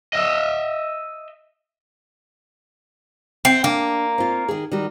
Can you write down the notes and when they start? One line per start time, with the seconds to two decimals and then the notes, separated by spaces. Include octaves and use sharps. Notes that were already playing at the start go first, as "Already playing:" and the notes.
0.13 D#5 E5
3.45 C4 E5
3.64 A#3 D4
4.18 C4 F4
4.49 D#3 G#4
4.72 D#3 G3 F#4